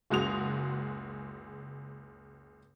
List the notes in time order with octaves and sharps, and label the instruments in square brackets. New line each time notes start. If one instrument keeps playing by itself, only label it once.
[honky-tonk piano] F#1 C#2 G#3 F#4 D#6 F7